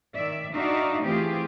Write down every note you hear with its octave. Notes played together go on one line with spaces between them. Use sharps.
D#3 D5 E5
D4 D#4 F#4 D5 E5 F5
E3 A3 C4 F4 G4 G#4